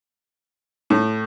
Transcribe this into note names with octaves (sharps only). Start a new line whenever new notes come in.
A2